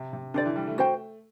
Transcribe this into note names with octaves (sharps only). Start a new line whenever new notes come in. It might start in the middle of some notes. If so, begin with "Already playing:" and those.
Already playing: C3
C3
D3 D4 G4 D5
E3
G3
A3
F#4 C5 G5